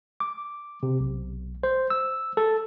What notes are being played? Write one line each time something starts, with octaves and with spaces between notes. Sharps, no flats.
D6
C3
B1
C5
E6
A4